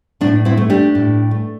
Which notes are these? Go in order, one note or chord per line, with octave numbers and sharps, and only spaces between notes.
A2 D4
C4 E4
A3
D4 G4
A2
A3